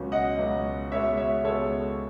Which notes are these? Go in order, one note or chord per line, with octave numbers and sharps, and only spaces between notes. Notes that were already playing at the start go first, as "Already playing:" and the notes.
Already playing: C#2 B2 F#3 C#4
D#5 F#5
C#2 B2 F#3 C#4
C#2 B2 G#3 B3 C#5 E5
C#5 E5
C#2 B2 G#3 B3 A4 C#5